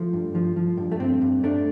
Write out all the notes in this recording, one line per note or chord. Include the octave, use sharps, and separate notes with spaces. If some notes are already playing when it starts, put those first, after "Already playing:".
Already playing: F3 A3
G2
F3
F3
G2
A3
G2 C4
G2
G2 A3 D4